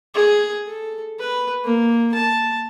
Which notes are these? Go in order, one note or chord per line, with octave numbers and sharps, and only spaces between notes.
G#4
A4
B4
A#3
A5